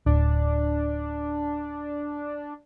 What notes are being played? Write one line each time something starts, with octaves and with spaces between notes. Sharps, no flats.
D1 D4